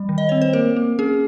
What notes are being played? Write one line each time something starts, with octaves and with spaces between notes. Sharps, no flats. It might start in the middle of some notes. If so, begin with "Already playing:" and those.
Already playing: G3
D#3
D#5
C4 C#5
C5
A#3 A#4
A#3
C#4 G#4